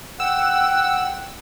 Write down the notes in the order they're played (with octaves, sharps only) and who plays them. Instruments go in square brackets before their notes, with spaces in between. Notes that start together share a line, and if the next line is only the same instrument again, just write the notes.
[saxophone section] F#5 [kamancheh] G5 [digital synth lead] E6